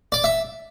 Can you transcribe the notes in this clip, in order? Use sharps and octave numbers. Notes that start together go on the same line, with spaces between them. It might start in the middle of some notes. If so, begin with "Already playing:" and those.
D5
E5